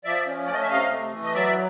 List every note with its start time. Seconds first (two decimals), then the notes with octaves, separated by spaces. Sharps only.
0.04 F3 D5 E5
0.27 C#4
0.47 A3 D5
0.54 D#5
0.62 E5
0.69 C3 D#5 F5
0.91 A3
1.12 E3
1.24 D#5
1.34 F#3 D5 E5